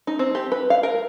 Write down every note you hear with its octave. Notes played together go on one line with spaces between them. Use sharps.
D#4
C4
G4
B4
F5
A#4